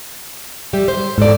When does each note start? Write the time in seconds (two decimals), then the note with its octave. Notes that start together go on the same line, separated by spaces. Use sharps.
0.73 G3 G4 E5
0.88 C5
1.18 G#2 A4 D5